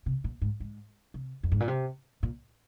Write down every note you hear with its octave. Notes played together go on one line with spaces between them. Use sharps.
C3
A#2
G#2
G#2
C3
F2
G#2
A#2
C3
A#2